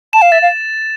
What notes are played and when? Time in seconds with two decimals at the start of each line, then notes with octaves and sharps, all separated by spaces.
0.13 A5 E7
0.22 F5
0.32 E5 A6
0.42 F5